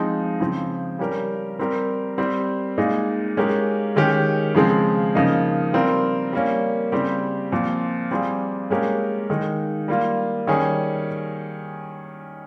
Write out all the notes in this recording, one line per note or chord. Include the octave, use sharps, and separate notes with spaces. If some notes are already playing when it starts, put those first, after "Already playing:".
Already playing: F3 G#3 C4 D#4
C#3 F3 C4
G3 C#4 G4 A#4
G3 C4 G4 A#4
G3 C4 G4
A#2 G#3 D#4 G#4
G#3 C#4 G4 A#4
D#3 G#3 C#4 G4
C#3 F3 G#3 C4
C#3 F3 A#3 D#4
G3 C4 F4 A#4
G3 A#3 C#4
C#3 G3 C4 G4
A#2 F3 C4 F4
G3 C4 F4 G#4
A#2 G#3 C#4 G4 A#4
D#3 G#3 D#4
G3 A#3 F4
D#3 G3 C#4 G#4